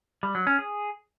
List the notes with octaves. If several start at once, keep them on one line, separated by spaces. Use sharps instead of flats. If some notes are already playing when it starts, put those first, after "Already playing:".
G3
F#3
C#4
G#4